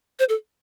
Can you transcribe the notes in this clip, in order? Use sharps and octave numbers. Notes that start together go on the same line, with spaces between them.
C5
A4